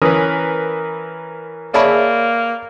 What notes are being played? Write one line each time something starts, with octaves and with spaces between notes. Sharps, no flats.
E3 C#4 A#4 B4 D#6
A#3 G#4 C#5 D5 E5 A5 B5